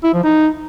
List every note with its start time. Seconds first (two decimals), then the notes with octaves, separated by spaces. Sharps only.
0.04 E4
0.14 F3
0.24 D#4